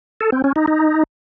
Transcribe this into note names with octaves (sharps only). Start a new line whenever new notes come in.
A4
C4
C#4
D#4
D#4